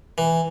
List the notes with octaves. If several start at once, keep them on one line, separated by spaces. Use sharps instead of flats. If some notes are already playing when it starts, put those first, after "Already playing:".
E3